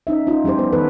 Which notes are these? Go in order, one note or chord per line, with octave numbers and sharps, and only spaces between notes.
C#4 D#4 E5
C#4 D#4 F4
F3 G3 C#4 G4 C5
B3 C5
D#3 B3 A4 B4